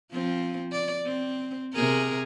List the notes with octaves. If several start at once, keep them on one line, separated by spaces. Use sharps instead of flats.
F3 C4
D5
C4
C3 G#4 A#4